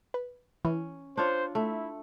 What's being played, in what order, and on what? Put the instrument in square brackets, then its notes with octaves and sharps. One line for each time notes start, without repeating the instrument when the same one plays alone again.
[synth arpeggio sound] B4
[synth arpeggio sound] E3 [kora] C#4
[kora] D4 F4 C#5 [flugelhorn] C5
[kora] A3 [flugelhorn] E4